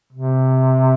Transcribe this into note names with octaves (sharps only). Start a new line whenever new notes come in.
C3